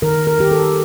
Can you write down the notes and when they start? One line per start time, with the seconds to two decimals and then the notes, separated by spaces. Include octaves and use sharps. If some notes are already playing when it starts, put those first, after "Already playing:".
0.02 D#3 A#4
0.27 A#4
0.39 D#3 G4
0.52 A4